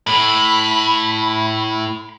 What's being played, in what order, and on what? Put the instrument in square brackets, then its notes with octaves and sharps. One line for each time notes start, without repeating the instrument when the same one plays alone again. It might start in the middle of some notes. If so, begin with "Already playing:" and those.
[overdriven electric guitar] A2 [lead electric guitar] B5